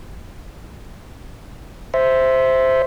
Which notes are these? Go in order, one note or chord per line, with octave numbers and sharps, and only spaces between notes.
C5 E5